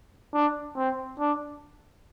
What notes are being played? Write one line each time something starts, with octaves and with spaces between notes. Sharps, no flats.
D4
C4
D4